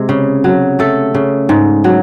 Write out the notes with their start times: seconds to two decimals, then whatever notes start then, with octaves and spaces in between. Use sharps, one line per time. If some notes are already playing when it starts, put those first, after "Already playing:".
Already playing: C3 G#3
0.09 C#3
0.44 F#3
0.79 A3 A4
1.14 C#3
1.49 G#2
1.84 F#3